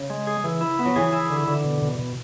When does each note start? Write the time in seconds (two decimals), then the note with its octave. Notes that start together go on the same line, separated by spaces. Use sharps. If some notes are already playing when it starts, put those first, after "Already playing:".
Already playing: C#3
0.10 G#3
0.27 G#4
0.44 E3
0.61 E4
0.79 B3
0.85 F#3
0.96 E3 G#4
1.13 E4
1.30 D3
1.48 D3
1.64 B2
1.82 B2
1.99 B2